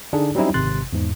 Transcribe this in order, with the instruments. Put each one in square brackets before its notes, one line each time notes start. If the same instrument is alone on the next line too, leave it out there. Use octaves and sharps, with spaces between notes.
[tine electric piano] D3 D4 D#4 G#4
F#3 G3 C4 C#4 D#4 E4
G#1 C3 C6 F#6 A6
E2 G#2